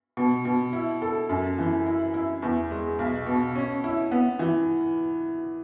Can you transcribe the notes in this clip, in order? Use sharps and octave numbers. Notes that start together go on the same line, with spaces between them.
B2
B2
E4
A4
F#2
E3
E4
E4
E2
G#3
B1
B2
C#4
E4
B3
E3